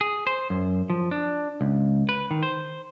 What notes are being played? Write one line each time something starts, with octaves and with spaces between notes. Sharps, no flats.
G#4
C5
F#2
F3
D4
C#2
B4
D#3
C5